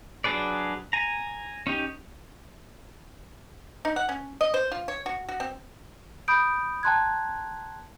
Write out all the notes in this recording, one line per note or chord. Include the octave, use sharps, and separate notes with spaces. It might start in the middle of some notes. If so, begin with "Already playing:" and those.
F#3 D4 G#4 B4 D5
G#5 A#5
C#4 D#4 G4
D#4
F#5
C#4
D#5
C5
F4
C#5
F#4
F#4
C4
B5 D#6 G6 D7
G5 A5 A#5 C6 F#6 G#6